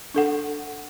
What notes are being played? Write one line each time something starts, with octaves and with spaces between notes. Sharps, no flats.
D4 A4 F#5